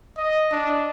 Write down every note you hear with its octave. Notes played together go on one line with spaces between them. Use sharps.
D#5
D4